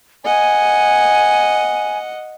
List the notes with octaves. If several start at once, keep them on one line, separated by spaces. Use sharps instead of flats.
D#5 F#5 G#5